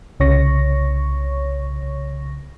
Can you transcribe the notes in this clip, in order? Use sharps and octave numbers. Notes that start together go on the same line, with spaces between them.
C2 C#3 C#5 C#6 A#6